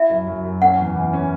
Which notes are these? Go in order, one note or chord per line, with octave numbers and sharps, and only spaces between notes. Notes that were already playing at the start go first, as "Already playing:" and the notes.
Already playing: E4 E5
F#2
F#2
F#2
C#4 F#5
E2
E3
C#4